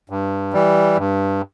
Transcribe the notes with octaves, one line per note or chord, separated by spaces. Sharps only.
G2
E3 G3
G2